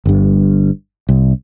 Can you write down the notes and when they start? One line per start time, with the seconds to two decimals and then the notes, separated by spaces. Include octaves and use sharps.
0.05 G1 G2
1.09 C2